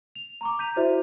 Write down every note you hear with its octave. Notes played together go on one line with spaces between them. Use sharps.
F7
A#5 C#6 D6
A#5 G6 B6 D#7 F7
E4 F#4 C5 D5 E5